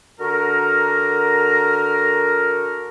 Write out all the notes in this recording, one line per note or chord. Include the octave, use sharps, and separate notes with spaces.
D3 F#4 A#4